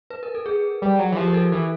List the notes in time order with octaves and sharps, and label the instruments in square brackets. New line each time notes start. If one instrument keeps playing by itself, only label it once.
[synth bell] B4
A#4
A4
G#4
[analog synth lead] G3
F#3
E3
[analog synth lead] F3 [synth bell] G4
[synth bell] A#4
A4
[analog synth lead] E3 [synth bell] A4